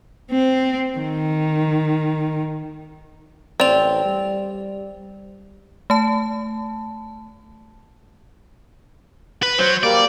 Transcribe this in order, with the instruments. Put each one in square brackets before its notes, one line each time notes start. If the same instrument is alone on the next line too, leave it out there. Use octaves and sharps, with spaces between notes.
[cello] C4
D#3
[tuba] A1 [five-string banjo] C4 [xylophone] D5 F7
[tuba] G3
[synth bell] A3 A5
[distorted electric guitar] B4
[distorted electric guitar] F#3 [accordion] C5
[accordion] G3 A#3 [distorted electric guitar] D5